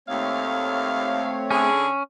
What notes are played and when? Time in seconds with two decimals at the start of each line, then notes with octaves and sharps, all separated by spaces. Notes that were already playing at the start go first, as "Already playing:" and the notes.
0.08 D#2 A3 C4 C#5 F5
1.50 D3 C#4 G#4